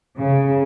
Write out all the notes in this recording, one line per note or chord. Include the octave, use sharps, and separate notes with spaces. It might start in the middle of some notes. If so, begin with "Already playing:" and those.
C#3